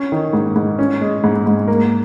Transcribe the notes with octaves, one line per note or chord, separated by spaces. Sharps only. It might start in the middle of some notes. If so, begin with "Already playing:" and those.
Already playing: C#4
D#3
G#2
G#2
C#4
G#3
G#2
G#2
A#3